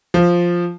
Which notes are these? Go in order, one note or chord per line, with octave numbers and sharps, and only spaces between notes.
F3